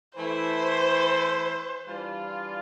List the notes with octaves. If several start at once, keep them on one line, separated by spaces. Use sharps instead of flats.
E3 A3 E4 C5
E3 G3 D4 F4